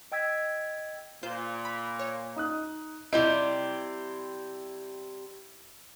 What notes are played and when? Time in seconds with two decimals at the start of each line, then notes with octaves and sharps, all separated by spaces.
0.12 D#5 G5 E6 G#6 B6
1.23 A#2 F4 C5 G6
1.65 B5
1.99 C#5
2.36 D#4 D#6 F#6
3.13 C3 G3 C4 E4 D#5 G7